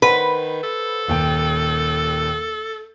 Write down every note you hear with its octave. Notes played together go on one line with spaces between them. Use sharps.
D#3 B4 C5 F#5 B5
A4
D#1 D#2 G5